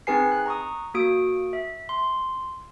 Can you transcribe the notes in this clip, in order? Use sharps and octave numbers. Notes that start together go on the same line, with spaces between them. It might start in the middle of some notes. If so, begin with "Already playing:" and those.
C4 D#4 G#4 B4 G#5 C7
F#6
A#5 C#6 D#6
A#3 F#4 D#6 D7
E5
C6